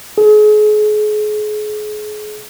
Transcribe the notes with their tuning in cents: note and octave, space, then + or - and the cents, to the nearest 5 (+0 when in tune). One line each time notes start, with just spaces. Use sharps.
G#4 +35